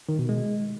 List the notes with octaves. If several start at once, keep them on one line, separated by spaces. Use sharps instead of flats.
D#3
B2
G#3